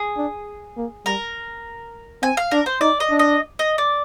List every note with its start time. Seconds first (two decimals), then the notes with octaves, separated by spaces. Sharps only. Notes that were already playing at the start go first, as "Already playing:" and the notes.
Already playing: G#4
0.17 D4
0.77 A#3
1.06 G3 A#4
2.22 C4 G#5
2.37 F5
2.51 D4 A#4
2.66 C5
2.81 D#4 D5
3.00 D#5
3.10 D4
3.19 D#5
3.59 D#5
3.78 D5